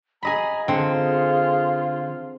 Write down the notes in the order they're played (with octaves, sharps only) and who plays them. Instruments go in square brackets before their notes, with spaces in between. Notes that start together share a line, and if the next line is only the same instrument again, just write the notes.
[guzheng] G#4 D#5 B5 [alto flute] A#5
[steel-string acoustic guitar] D3 [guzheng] C4 [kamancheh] F4 [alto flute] G#4